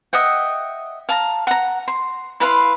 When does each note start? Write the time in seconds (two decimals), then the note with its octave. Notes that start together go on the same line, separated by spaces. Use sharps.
0.13 D#5 E5 F#5 G5
1.09 F5 A5 A#5
1.47 F#5 A#5
1.88 C6
2.40 E4 B4 F5 C6